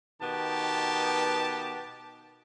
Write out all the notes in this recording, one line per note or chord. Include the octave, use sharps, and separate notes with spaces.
B2 D#3 B3 G4 A5